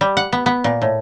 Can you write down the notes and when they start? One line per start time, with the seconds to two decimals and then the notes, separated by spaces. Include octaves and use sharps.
0.01 G3
0.17 F#5
0.32 B3
0.46 B3
0.64 A#2
0.82 A2